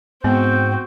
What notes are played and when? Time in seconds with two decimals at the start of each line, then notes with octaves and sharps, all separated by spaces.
0.24 G#2 B3 C4 F#4 G5 G6